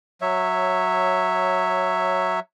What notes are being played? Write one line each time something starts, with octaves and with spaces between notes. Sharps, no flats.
F#3 C#5 E5